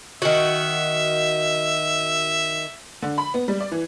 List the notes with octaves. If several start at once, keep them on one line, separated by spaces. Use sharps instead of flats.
D#3 F#4 E5
D3
B5
B3
G3
D5
E3